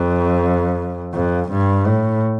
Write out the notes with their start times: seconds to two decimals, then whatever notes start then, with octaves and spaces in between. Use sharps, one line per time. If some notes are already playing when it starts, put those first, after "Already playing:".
Already playing: F2
1.14 F2
1.51 G2
1.87 A2